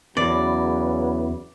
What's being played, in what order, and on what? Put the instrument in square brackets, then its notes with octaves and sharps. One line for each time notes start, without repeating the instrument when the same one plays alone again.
[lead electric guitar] E2 [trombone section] C#3 F#3 B4 [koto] D5